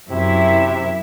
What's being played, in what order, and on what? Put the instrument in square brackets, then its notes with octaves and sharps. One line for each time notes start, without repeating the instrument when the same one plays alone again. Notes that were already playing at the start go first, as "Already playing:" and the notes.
[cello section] F#2 E4 E5 [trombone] C3